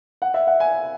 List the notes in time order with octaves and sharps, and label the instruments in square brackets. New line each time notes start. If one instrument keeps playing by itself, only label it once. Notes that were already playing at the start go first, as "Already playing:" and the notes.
[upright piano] F#5
E5
F#5
G#5